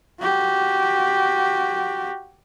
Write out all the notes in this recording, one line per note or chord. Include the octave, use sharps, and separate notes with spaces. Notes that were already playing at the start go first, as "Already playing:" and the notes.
F#4 G4